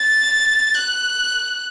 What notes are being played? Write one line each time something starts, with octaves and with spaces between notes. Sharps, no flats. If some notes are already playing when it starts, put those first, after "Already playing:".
Already playing: A6
F#6